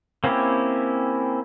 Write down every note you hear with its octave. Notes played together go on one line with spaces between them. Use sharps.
A#3 C4 C#4 E4 G4